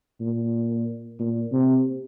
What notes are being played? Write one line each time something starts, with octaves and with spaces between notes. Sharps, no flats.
A#2
A#2
C3